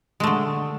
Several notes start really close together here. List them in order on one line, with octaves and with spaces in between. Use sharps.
G#3 A3 D3